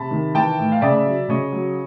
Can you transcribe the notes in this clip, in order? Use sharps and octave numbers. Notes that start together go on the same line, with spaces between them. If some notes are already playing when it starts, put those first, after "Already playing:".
Already playing: C3 A5 B5
D#3
E3 G5 A5
A2
F5
C#3 D5 E5
F#3
C#3 C#5 D#5
F#3